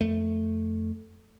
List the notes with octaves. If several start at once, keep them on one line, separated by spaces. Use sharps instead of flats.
F2 A3